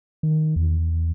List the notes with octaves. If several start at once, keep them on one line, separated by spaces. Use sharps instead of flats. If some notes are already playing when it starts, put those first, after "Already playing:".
D#3
E2